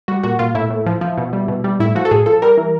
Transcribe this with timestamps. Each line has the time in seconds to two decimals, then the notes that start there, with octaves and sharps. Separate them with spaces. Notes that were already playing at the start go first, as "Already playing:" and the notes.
0.08 G3 F#4
0.23 A#2 F#4
0.39 A#2 F4
0.55 A2 E4
0.70 A2
0.86 F3
1.01 F3
1.18 B2
1.33 G3
1.48 B2
1.64 G3
1.80 A2 E4
1.95 F3 F#4
2.05 A4
2.11 A2 G#4
2.26 F3 A4
2.42 G3 A#4
2.57 E3